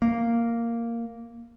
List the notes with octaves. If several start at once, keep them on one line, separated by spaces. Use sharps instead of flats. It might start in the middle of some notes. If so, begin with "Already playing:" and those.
A#3